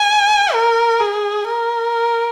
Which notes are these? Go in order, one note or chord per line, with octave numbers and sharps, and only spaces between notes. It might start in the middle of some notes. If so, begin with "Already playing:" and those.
Already playing: G#5
A#4
G#4
A#4